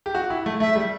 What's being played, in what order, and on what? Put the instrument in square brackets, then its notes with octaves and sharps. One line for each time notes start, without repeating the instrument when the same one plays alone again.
[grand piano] G4
F#4
E4
A3
[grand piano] A3 [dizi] E5
[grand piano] G3